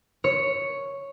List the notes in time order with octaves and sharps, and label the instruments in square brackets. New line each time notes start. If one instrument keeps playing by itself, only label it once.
[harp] C#5